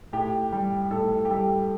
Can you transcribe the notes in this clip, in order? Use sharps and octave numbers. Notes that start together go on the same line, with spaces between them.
A2 G4
G3
A2 A4
G4
G3 A4